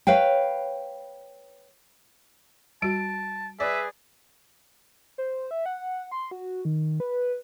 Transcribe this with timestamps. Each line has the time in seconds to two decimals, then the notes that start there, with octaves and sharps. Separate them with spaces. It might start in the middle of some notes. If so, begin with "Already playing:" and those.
0.07 B4 C#5 F5 G5
2.82 G3 F#4 A5 D7
3.60 G#4 B4 D5 E5
5.18 C5
5.51 E5
5.66 F#5
6.12 C6
6.31 F#4
6.65 D#3
7.00 B4